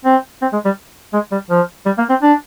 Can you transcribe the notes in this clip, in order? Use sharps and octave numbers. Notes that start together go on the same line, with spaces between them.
C4
C4
G#3
G3
G#3
G3
F3
G3
A#3
C4
D4